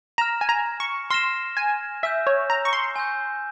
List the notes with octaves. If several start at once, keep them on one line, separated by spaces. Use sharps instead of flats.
A#5 F6 A#6 E7
G#5
A#5
C#6
C6 F6 A#6 E7
G#5
E5 G#5 E6 G6
C#5
A#5
C#6
C6
G#5 E6 G6